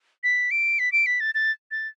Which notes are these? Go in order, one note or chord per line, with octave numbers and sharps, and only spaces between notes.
B6
D7
B6
D7
B6
A6
A6
A6